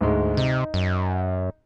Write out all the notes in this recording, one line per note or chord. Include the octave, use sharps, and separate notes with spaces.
D2 G#2 G#3
C3 D#4
F#2